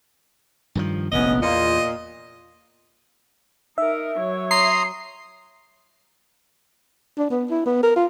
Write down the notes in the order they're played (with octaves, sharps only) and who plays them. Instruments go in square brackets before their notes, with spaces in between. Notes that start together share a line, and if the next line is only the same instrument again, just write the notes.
[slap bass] G2 D#3 F3
[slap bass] F1 A#1 [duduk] B3 [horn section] C#4 D#5
[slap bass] E2 [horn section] A#2 [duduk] F4 [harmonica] D#5
[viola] D#4 A#4 [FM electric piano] E5
[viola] F#3 C#5
[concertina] A#5 C6 D#6 [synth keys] C7
[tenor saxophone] D4
B3
E4
B3
A#4
F4